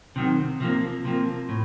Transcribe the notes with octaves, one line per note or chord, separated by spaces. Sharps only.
C3 D#3 F#3
C3 F3 A#3
C3 F3 A#3
A2